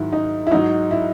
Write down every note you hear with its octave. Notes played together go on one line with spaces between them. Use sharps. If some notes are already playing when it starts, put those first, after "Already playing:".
Already playing: G#2 D#3 F#3 E4
D#4
E4
G#2 F#3 D#4
E4